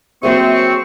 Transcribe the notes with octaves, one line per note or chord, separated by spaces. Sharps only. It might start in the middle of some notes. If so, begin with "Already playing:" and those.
F#3 A#3 C4 G#4 E5 C#6